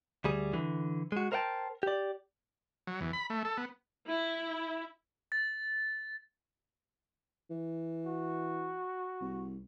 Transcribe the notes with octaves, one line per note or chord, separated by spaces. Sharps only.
D2 G3 G#4
D3 E3
G#3 F#4
A#4 C5 E5 F#5 G5 A5
G4 D5
F#3
E2
B5
A3
A4
B3
E4
A6
E3
F#4
C2